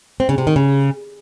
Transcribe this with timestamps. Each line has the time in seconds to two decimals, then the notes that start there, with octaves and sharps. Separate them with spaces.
0.20 C4
0.29 C#3
0.38 C3
0.47 D#3
0.56 C#3